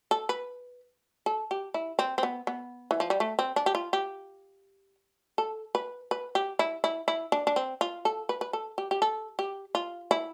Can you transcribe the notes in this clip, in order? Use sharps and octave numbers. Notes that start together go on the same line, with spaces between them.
A4
B4
A4
G4
E4
C4
C4
B3
B3
E3
F3
G3
A3
C4
D4
G4
F4
G4
A4
B4
B4
G4
E4
E4
E4
D4
D4
C4
F4
A4
B4
B4
A4
G4
G4
A4
G4
F4
E4